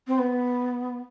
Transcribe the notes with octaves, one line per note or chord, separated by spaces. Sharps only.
C4
B3